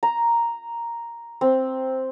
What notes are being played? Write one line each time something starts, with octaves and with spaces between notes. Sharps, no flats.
A#5
C4